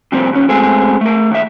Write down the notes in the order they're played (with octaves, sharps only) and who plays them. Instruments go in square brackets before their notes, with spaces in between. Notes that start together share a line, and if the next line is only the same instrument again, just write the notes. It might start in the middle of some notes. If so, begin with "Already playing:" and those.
[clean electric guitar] C3 F3 G3 A#3 C4
D#2 C#4
G#3 A3 B3 C4 G#4
A3 A#4
D#2 E5